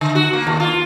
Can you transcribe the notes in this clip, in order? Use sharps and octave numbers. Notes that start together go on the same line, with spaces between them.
D3
F#4
A#3
D#2
F4